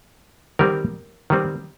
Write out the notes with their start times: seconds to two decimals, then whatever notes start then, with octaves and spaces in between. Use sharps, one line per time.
0.59 D#3 G3 C4 A#4
1.30 D#3 G3 C4